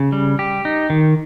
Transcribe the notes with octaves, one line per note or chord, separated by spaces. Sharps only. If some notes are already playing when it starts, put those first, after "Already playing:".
Already playing: C#3
G3
G4
D#4
D#3